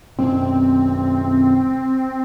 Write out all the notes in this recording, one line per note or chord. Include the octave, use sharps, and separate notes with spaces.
B1 F#2 B2 C4